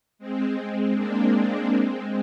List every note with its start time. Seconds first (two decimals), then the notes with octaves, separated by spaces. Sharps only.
0.19 G#3 C4
0.56 G#3 C4
0.94 A#3 D4
1.69 G#3 C4